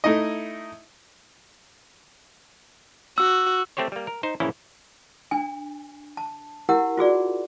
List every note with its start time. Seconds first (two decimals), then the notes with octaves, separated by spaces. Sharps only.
0.04 A3 D#4 E4 D#5
3.18 F#4 E6
3.77 A3 C4 G4 C5 C#5
3.92 G3 A#3
4.07 A#4
4.23 D#4 C5
4.40 A#1 C#3 E3 A#3 C#4 E4
5.31 D4 G#5
6.17 A5
6.69 E4 G4 A#4 F#5
6.97 F4 F#4 G#4 D5